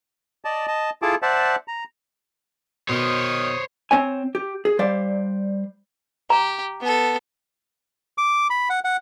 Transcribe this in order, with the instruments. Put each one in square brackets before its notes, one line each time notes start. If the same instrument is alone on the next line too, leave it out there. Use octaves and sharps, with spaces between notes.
[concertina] D5 D#5 A5
D#5 A5
E4 F4 G#4 A4 A5 D6
C5 D5 E5 F#5 A5
A#5
[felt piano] B2 [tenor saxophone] D#3 [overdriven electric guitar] C5 C#5 [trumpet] D#6
[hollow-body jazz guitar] C4 C#5 G#5
G4
G#4
G3 C5 D5 F5
[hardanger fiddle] G4 [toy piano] A#5
[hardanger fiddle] B3 A4
[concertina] D6
B5
F#5
F#5